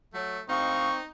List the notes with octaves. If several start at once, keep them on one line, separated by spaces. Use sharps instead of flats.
F#3 A3
D2 C4 D#4 D#5 F5 C#6